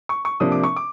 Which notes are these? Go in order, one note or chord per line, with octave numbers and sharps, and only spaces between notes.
C#6
C#6
C3 F3 A#3 D4 D#6
D6
C#6
D6